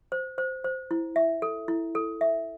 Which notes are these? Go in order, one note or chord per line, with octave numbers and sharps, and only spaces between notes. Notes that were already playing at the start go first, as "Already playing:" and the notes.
C5
C5
C5
E4
E5
A4
E4
A4
E5